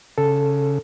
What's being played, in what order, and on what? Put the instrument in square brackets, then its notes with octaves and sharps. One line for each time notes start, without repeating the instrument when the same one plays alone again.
[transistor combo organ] C#3 [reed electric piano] A4